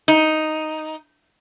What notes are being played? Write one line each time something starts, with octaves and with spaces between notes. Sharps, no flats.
D#4